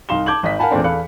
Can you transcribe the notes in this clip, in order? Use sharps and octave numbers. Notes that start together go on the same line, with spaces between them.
C2 D#4 F5 C6 E7 G7
A5 D6 G6 G#6 F#7
G#1 D#5 B6
A#4 F5 F#5 G#5 A5 B5
E2 A#2 A3 C4 D4
E2 A4 F5 B5 F#6 C#7